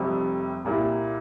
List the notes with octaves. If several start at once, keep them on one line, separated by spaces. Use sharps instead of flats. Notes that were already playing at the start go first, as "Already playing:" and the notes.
Already playing: F1 F2 C3 G3
C2 A#2 G3 A#3 E4